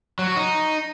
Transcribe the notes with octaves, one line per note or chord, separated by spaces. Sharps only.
F#3
F#4
D#4